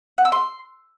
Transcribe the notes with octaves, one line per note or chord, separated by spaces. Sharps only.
F#5
E6
C6